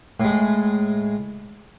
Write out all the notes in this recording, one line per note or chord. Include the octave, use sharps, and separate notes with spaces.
A2 G#3